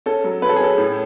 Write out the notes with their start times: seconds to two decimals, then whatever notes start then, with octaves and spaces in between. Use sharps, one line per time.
0.06 C#4 A4
0.24 F#3
0.42 C#4 B4
0.49 A4
0.56 G#4
0.60 C#4 A4
0.78 A2